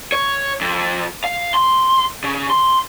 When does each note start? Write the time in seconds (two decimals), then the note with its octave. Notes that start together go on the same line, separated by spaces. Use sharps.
0.12 C#5
0.61 F2
1.24 F5
1.54 C6
2.24 C#3
2.50 C6